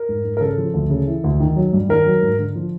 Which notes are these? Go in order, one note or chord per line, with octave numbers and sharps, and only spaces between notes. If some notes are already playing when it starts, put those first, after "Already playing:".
Already playing: A#4
G#2
G#2
A#4
C#3 A4
F3
D2
C#3
E3
D2
D#3
F#3
G2
D#3 A#4
F#3
G#2
D3
F3